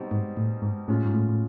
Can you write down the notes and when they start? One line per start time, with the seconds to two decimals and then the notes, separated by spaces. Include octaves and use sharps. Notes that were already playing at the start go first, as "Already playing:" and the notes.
Already playing: B2 G3 C4 D#4
0.11 G#2
0.37 A2
0.62 G#2
0.88 A2 G#3 C#4 F4
1.05 G#2
1.14 A2
1.29 A2